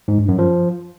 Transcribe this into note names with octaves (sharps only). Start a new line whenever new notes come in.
G#2
G2
F#2
F3